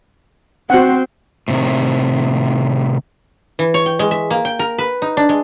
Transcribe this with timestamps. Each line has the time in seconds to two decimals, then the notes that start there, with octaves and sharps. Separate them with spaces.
0.70 C4 F#4 C5 F#5
1.48 A2 C3 D#3
3.59 E3
3.74 C#5
3.86 G5
3.99 G#3
4.11 E5
4.31 A#3
4.45 G5
4.59 A#4
4.78 B4
5.02 D#4
5.17 D4
5.29 G#3